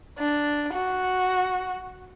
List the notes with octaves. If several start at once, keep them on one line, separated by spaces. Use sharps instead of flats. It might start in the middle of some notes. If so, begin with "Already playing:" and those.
D4
F#4